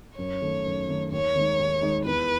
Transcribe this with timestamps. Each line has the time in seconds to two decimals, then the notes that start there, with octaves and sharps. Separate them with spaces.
0.18 F#2 C#5
0.42 D#3 A3
0.65 F#2
0.88 D#3 A3
1.12 D#2 C#5
1.35 D#3 G#3 D#4
1.59 D#2
1.82 D#3 G#3 D#4
2.06 E2 B4